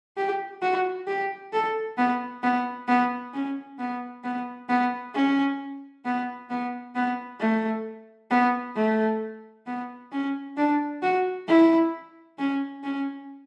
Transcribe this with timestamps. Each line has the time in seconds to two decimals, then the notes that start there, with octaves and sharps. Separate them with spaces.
0.17 G4
0.62 F#4
1.07 G4
1.53 A4
1.97 B3
2.43 B3
2.88 B3
3.33 C#4
3.78 B3
4.24 B3
4.69 B3
5.14 C#4
6.05 B3
6.50 B3
6.95 B3
7.40 A3
8.31 B3
8.76 A3
9.66 B3
10.12 C#4
10.57 D4
11.02 F#4
11.48 E4
12.38 C#4
12.83 C#4